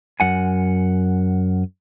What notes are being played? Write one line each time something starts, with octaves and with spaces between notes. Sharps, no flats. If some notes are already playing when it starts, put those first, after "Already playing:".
F#2 F#5 G#5